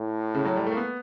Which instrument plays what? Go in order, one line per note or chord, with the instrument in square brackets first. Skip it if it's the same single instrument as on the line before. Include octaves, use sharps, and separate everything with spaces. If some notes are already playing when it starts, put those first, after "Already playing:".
Already playing: [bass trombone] A2
[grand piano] C#3
F#3
G3
A3
A#3
B3